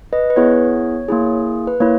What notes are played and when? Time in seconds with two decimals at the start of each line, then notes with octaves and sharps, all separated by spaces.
0.13 B4 D#5
0.30 B4
0.36 B3 E4 G#4 C#5
1.08 A#3 E4 G#4
1.67 B4
1.80 A#3 E4 C#5